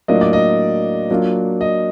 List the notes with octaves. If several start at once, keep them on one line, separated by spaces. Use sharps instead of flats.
A2 F#3 A#3 D4 F4 D#5
D5
D#5
F#3 A#3 D4 F4
D#5